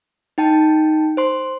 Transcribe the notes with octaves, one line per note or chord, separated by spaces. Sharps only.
D#4 G5 A5
C5 C6